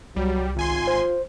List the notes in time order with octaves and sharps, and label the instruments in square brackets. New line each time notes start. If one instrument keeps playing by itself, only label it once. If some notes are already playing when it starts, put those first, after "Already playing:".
[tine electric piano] C2 [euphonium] F#3 [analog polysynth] G3
[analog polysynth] G#1 G#5 C6 [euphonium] F4
[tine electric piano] C5